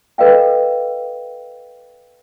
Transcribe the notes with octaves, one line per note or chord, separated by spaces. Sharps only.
A4 B4 D#5 F5 G5